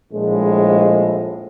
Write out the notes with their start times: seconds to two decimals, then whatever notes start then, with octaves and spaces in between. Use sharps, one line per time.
0.12 A#1 A2 F3 G#3